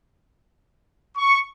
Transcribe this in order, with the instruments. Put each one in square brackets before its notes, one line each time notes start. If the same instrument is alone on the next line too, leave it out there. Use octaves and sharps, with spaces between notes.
[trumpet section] C#6